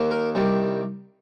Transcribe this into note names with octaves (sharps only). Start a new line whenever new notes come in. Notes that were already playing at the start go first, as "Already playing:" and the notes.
Already playing: D#2 D#3 A#3
A#4
C2 C3 D#3 G3